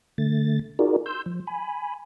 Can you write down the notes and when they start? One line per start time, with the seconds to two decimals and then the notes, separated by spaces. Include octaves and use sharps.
0.18 D3 A3 A6
0.79 D#4 F4 F#4 G#4 A#4 D5
1.06 C6 E6 G6
1.26 F3
1.47 G#5 B5